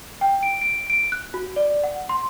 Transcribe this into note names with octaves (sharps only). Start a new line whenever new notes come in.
G5
D7
D7
D7
F#6
F#4
D5
F#5
C6